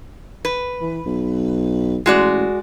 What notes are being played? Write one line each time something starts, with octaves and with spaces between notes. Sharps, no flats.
B4
E3
B1
A1 G#3 F#4 D5